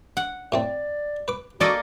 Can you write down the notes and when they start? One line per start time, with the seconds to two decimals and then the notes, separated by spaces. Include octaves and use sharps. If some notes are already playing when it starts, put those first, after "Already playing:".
0.17 F#5
0.52 A2 A3 C4 D5
1.28 B4 D6
1.61 A#3 D4 F#4 A4 D5 D#5